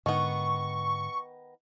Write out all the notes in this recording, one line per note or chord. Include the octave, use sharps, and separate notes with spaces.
G#2 D3 D#3 G#3 B3 C#6